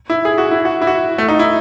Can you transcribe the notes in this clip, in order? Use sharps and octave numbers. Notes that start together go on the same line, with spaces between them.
E4
G#4
F#4
E4
F#4
E4
F#4
A3
D#4
E4